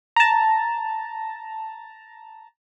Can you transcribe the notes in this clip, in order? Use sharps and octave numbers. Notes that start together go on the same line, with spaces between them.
A5 A#5